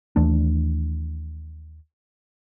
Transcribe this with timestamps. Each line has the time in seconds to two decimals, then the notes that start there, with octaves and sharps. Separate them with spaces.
0.16 D#2 E3 A3 D4